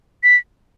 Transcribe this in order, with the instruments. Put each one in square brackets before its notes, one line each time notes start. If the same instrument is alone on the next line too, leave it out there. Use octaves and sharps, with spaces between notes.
[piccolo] B6